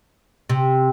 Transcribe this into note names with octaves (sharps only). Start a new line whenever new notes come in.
C3